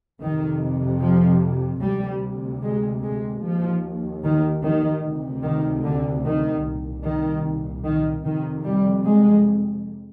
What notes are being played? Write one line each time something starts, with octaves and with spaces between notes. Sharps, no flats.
F2 C3 D#3
F3
D2 C3 G3
G#3
G#3
D#2 F3
D#3
D#3
D2 C3
D#3
D3
D#3
C2 A#2
D#3
D#3
F2 C3 D#3
G3
G#3